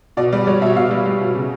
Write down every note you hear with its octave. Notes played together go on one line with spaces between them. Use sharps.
B2 D5
G3 D5
G3 C#5
B2 E5
B2 F5
G3
G3
B2
C#3